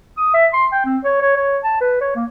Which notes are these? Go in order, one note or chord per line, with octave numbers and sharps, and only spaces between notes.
D#6
E5
C6
G5
C4
C#5
C#5
C#5
A5
B4
C#5
A#3